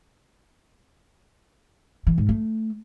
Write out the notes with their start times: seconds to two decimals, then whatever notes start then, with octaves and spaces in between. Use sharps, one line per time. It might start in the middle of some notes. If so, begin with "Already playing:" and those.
2.07 E3
2.18 G#2
2.29 A3